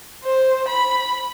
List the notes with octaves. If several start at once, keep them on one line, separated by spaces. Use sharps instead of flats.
C5
B5